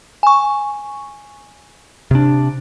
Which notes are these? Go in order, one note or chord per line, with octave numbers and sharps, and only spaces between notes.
G#5 C#6
C3 D4